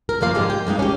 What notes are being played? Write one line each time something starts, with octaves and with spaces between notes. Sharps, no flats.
A#4
F#2 F3 A#3 F5
G#2 D3 G#3 G4
G5
G2 G#3 A#3 D#4
C#4 G4